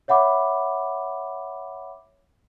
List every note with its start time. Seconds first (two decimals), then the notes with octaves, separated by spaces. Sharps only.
0.08 C#5 E5 F#5 B5 D6